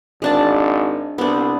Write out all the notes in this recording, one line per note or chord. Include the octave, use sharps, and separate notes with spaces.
G#1 G#3 D4 A5
C2 B3 D4